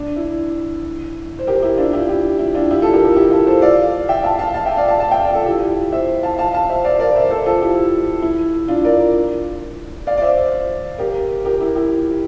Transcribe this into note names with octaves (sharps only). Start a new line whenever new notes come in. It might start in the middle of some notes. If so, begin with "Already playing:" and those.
Already playing: D4
E4
C5
G4 A#4
E4 G4
D4 F4
E4 G4
E4 G4
E4
D4 F4
E4 G4
F4 A4
G4 A#4
G4 A#4
E4 G4
F4 A4
A4 C5
D5 F5
E5 G5
F5 A5
F5 A5
F5 A5
E5 G5
D5 F5
F5 A5
F5 A5
E5 G5
D5 F5
F4 A4
E4 G4
C5 E5
F5 A5
F5 A5
F5 A5
C5 E5
D5 F5
A#4 D5
C5 E5
A4 C5
F4 A4
E4 G4
E4
D4 F4
A#4 D5
D5 F5
D5
C5 E5
G4 A#4
G4 A#4
E4 G4
E4 G4